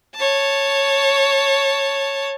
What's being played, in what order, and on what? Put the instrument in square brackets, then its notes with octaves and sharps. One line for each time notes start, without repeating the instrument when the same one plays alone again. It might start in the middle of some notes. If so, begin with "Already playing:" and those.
[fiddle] C#5 A5